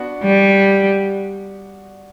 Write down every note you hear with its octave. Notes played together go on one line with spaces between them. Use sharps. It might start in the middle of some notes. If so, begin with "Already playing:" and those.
Already playing: B3 D4 F#4
G3